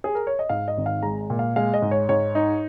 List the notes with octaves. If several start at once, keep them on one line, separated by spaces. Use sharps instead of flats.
G#4
A#4
C#5
D#5
G#2 F5
D#5
G#1
F5
G#3 A#5
A#2
F5
G#3 F5
D#5
G#2
C#5
G#2 C#5
D#4